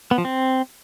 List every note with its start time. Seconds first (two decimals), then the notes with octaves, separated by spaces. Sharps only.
0.11 B3
0.18 F3
0.25 C4